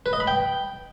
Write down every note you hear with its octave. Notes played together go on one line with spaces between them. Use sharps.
B4
D#5
B5
G5